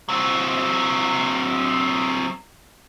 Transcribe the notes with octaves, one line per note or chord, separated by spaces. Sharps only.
F#3 C4